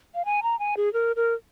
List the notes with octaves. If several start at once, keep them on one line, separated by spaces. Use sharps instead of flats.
F5
G#5
A#5
G#5
G#4
A#4
A#4